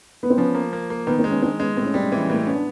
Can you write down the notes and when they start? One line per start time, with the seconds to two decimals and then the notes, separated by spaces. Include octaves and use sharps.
0.23 B3
0.30 C4
0.37 F3 B3 C#4
0.55 A#3
0.73 A#3
0.90 A#3
1.07 D#3 B3
1.18 A#3 C4
1.24 G#3
1.31 B3 C#4
1.42 G#3 C4 D4
1.59 G#3 B3 C#4
1.77 A2 C4
1.85 C#4
1.94 G3 C4
2.03 C#4
2.12 E3 C4
2.21 C#4
2.29 A2 A#3 C4
2.47 B3 C#4
2.54 D4